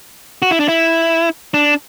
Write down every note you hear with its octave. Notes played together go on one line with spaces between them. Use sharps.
F#4
E4
D4
E4
D4